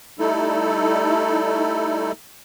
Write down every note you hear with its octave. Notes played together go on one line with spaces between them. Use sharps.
G3 A3 D#4 E4 A4